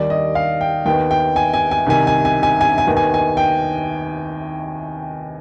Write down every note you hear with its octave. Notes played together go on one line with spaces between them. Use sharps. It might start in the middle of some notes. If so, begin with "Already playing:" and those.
Already playing: D#2 D#3 G3 D5
D#5
F5
G5
D#2 D#3 B3 G5
G5
G#5
G#5
G#5
C2 C3 D#3 G#5
G#5
G#5
G#5
G#5
G#5
D#2 D#3 B3
G#5
G#5
G5